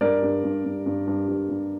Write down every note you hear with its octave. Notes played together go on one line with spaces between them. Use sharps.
G2 A#4 D5
G2
G2
G2
G2
G2
G2
G2